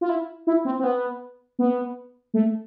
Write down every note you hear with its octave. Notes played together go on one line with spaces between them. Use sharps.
F4
E4
E4
C4
C4
B3
B3
A3